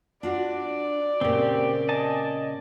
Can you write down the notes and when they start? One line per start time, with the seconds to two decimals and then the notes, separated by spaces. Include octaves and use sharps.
0.23 D4 F4 F#4 D5
1.21 A#2 C#3 C4 G4
1.89 D#5 G#5 A5